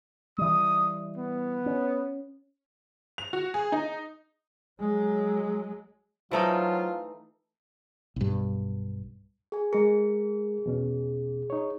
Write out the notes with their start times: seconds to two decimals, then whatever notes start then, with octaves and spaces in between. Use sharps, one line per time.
0.38 E3 G3 D#6
1.17 B3
1.66 C#4
3.18 F7
3.33 F#4
3.54 G#4
3.72 D#4
4.80 F#3 G#3
6.31 E3 F#3 A3 D#4 F4 C5 E5 A5
8.16 B1 G2
9.52 G#4 G#5
9.73 G#3 G#4 A#4
10.66 E2 B2 C#4
11.50 D#4 C#5